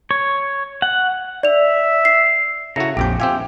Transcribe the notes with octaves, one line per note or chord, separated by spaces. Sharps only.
C#5
F#5
D5 E5 F7
C7
C#3 E4 F#4 A4 A#5
A#1 F2 G4 G5
C4 F4 G4 E5 G5 G#5